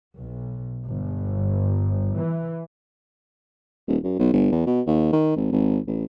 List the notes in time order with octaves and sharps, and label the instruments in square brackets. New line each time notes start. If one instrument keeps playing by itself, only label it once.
[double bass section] B1
G1
E3
[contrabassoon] D#1
F#2
B1
G1
E2
B2
D#2
D#3
G#1
G#1
A1